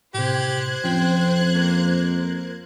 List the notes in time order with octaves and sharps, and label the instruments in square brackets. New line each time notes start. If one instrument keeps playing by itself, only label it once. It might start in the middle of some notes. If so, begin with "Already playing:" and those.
[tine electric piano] A2 C3 [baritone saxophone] G4 [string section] C5 F#6 G#6
[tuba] F2 [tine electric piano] F3 C#4 [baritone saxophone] C4
[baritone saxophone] A#3